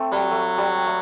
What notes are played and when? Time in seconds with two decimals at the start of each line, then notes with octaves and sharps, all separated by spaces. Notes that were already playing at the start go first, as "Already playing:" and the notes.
Already playing: A3 C4
0.12 F#3 G3
0.31 A3
0.58 G3
0.86 A3